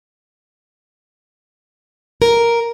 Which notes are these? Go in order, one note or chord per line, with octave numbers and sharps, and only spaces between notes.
A#4